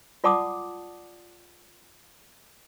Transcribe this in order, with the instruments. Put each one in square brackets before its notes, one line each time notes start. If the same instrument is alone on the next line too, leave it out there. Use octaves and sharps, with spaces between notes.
[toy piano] F4 D5 F#5 A5 D6 D#6